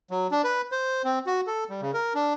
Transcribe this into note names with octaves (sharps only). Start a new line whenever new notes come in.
F#3
D4
B4
C5
C4
F#4
A4
G3
C#3
A#4
D4